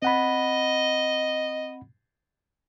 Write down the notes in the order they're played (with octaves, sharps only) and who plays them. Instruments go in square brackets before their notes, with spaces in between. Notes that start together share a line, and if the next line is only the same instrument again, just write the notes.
[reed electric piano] C4 F#5 B5 [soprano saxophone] D#5